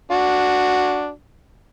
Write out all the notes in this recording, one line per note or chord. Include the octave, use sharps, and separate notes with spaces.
D4 F#4